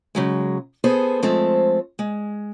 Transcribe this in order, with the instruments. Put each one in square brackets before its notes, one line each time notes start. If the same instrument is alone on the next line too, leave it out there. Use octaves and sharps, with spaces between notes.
[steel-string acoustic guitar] C#3 F#3 G#3
B3 G#4 A4 C5
F3 G#3 A3 C4 A4
G#3